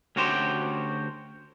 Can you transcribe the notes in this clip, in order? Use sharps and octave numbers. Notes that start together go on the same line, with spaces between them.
D2 C#4 F#4 G4 C5